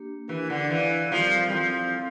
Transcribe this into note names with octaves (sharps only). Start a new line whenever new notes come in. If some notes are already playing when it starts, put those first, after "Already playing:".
Already playing: A#3 D4 G4
E3 D4 G4 A#4
D3
E3 E4 A4 D5 F5
F3 G3 C4 G4 A#4 F5
G3
F3 C4 E4 A4